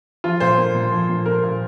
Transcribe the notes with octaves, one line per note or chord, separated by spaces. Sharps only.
F3 F4
A#2 C5
A#3
A#2
F3
A#2
A#3 A#4
A#2